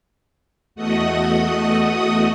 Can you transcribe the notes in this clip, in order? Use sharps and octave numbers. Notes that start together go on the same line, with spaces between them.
E2 A3 F#4 D#5 F#5 D#6